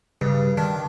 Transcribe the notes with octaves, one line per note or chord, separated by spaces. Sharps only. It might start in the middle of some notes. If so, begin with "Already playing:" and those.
G2 C#3
D#3 D4